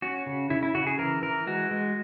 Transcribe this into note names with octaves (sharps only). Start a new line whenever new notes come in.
C#4 F#4
C#3
C#3 E4
E4
C#3 F#4
G#4
E3 A#4
E3 A#4
G#3 F#4
G#3